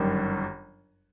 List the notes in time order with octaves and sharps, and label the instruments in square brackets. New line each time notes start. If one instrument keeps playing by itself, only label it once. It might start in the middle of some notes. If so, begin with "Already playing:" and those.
Already playing: [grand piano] G1 F#2 D#3 G3